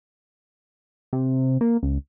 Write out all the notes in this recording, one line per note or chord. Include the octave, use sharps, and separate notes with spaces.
C3
A#3
C#2